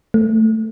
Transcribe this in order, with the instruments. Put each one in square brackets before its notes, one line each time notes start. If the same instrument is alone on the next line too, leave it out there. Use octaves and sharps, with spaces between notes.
[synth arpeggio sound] A3